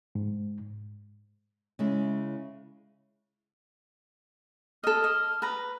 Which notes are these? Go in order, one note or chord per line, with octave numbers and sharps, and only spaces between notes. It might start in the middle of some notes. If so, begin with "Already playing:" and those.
G#2
C#3 G#3 E4
A4 D#5 F6
D#5
B4 A#5